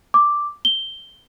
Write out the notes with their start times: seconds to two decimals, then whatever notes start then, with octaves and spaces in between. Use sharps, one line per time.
0.14 D6
0.65 G7